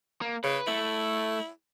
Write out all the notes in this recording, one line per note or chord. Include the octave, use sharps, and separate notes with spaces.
A#3
C#3 B4
A3 E4